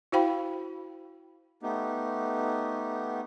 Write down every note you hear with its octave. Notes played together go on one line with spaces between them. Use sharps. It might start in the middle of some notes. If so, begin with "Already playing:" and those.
E4 F#4 C5 F5 G5 B5
A3 B3 D#4 G4